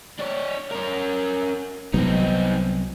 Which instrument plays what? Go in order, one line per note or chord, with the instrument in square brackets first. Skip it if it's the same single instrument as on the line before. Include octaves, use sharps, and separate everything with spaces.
[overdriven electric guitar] D4 C#5
C#4 A#4
[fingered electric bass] C2 F#3 B3 [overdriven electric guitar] C4 D#4